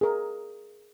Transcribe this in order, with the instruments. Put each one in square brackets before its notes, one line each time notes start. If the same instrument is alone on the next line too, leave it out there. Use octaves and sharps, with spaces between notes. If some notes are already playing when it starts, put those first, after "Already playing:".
[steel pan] G#4 A#4